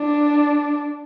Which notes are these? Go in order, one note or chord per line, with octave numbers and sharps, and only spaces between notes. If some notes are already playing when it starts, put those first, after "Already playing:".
Already playing: D4